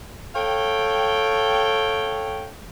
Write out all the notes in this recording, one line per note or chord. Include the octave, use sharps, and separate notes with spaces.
A4 C#5 F5 G5